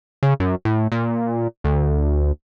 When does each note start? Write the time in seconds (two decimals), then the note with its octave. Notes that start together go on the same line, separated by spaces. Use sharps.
0.23 C#3
0.40 F#2
0.65 A2
0.92 A#2
1.64 D2